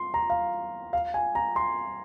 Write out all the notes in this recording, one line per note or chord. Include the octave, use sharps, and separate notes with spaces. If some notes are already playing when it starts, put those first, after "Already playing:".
Already playing: C6
A#5
F5
F5
G#5
A#5
C6